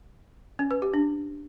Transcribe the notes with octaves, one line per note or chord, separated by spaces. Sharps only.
C#4
B4
G4
D4